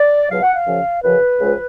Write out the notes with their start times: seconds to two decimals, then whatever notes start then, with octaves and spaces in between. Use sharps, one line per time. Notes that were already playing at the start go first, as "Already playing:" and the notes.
Already playing: D5
0.30 C#2 B2 F#3 F5
0.42 F#5
0.55 F5
0.67 F#2 C#3 F3
1.04 F#2 C#3 F3 B4
1.40 C#2 C#3 F3 G#3